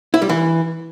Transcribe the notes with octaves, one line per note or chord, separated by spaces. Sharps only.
E4
G3
E3